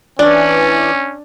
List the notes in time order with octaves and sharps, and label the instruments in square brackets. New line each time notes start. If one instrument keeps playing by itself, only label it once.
[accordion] E3 [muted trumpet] C#4 [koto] D4 [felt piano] D5